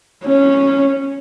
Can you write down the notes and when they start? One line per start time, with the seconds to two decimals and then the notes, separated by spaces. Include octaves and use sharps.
0.26 C#4